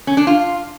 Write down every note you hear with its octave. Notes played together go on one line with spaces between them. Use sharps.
C#4
D4
F4